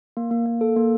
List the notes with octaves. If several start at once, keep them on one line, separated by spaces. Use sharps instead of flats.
A#3
A#3
A#3
A4
A#3